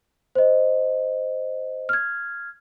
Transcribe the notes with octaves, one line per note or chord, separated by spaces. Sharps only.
C5 D#5
F6 G#6